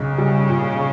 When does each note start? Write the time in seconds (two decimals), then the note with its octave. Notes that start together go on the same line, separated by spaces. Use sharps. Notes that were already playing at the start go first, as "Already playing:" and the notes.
Already playing: B1 C#3
0.18 G3
0.49 A#2